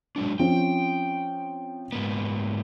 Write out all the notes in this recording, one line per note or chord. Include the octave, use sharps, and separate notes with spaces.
F#3 G#3 D4
F3 C4 C#4 G5
G#2 A#3 B3